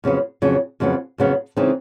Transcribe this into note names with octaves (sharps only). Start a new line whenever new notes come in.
F2 C#3 F#3 B3
F2 C#3 F#3 B3
F2 C#3 F#3 B3
F2 C#3 F#3 B3
C#3 E3 G#3 C4 D#4